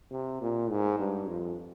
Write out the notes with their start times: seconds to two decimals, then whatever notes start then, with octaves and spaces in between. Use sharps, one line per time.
0.11 C3
0.41 A#2
0.70 G#2
0.99 G2
1.28 F2